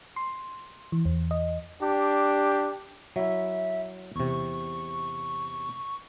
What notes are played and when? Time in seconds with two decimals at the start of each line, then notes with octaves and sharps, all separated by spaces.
0.16 C6
0.92 E3
1.05 E2
1.31 D#5
1.82 D4 G4
3.16 F#3 E4 E5
4.16 E2 C3 C#6